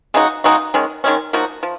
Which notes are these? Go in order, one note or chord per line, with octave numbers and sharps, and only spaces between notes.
C#3 G#3 D#4 F#4
C#3 G#3 D#4 F#4
D#3 G#3 C#4
D#3 G#3 C#4
F3 A#3 D#4 F#4
F3